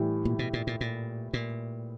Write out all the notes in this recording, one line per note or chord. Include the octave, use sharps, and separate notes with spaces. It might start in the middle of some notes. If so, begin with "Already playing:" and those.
Already playing: A2 E3 G3
A#2
B2
A#2
A#2
A#2
A#2